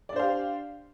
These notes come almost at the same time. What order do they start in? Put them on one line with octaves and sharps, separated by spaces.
D5 D4 C5 F5 G4